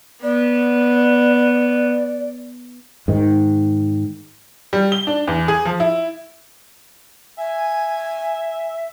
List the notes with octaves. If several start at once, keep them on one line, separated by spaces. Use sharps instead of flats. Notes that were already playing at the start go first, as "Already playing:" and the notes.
B3 D5
G#2 D#3
G3
G7
D4
E2
G#4
F3
E4
E5 G#5